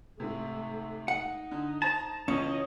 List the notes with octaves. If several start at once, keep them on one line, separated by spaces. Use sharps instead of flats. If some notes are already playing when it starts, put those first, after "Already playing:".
G#2 C3 A3
D#4 F#5
D3
C5 A5 A#5
C#2 E3 C#4 C#5 D#5